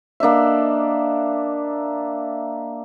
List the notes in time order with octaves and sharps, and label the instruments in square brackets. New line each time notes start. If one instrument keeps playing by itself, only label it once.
[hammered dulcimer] A#3 D4 D#5 E5